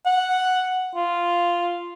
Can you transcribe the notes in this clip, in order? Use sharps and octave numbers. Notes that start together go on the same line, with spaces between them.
F#5
F4